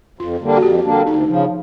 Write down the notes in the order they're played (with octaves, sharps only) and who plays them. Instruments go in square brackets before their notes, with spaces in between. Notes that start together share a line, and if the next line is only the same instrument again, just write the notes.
[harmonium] F2 [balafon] F4
[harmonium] D3 G3 A#3 D4
[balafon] F#4
[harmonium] F2 [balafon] G4
[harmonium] D3 G3 A#3 D4
[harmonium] D2 [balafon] D#4
[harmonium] C#3 F3